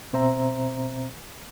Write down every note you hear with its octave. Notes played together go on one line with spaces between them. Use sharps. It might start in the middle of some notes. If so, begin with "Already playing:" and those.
B2 C4 C5 E5 A#5